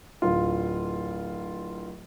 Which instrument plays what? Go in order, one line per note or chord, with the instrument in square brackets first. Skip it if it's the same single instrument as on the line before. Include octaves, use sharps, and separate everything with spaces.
[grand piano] D1 F4